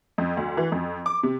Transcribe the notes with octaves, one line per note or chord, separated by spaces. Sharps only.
F2
D2
E3
F2
D6
C3